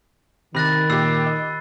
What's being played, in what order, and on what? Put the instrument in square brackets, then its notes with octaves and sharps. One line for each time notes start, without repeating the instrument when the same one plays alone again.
[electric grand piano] C3 A#6 [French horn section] D#3 [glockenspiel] B5 F#6 A6
[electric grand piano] A#2 G4 [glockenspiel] E6 C7
[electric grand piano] D#5